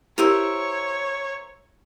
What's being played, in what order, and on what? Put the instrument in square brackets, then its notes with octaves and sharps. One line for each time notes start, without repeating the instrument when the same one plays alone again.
[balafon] E4 G4 [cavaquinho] A#4 C5 E5 [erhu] C#5